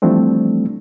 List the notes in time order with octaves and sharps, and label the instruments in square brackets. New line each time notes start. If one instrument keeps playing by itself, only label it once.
[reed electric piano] E3 F3 G3 A3 C4 D4